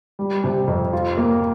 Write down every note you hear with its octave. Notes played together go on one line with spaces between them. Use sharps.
G3
C3
F2
F4
A#3